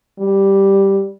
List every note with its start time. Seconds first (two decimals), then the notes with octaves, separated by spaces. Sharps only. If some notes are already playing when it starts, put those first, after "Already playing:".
0.19 G3